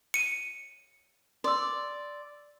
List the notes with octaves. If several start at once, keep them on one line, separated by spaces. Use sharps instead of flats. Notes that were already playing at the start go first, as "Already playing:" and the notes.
C#7 D#7
D5 C6 E6